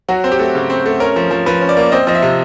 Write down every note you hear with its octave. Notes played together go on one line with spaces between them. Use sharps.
F#3 F#4
C4
G4
A3
C#3
C4
A3
C#4 A#4
F3
F3
F3 B4
C#4
D5
A#3
C4 D#5
F3 D#5
E5
C3